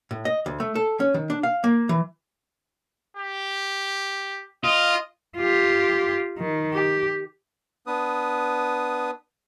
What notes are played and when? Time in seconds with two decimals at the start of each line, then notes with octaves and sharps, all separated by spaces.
0.11 A2
0.25 D#5
0.46 D2
0.60 A3
0.75 A4
1.00 C#4
1.14 D#3
1.30 D4
1.43 F5
1.64 A#3
1.89 E3
3.17 G4
4.64 F4 D#5
5.37 F4 G4
6.38 D#3
6.73 G4
7.87 B3 D4 B4 D#6